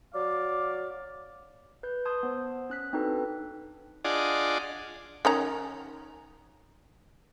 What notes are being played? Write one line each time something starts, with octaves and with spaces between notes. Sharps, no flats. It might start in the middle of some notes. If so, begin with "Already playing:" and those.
F#3 D5 F5 D6
B4 G6
A5 C6 D#6 G6 G#6
B3 C5
C#4 F#6 B6
C4 D4 D#4 F#4 A4 B4
D4 F4 G#4 D5 D#5 F#5
D#3 C#4 A#5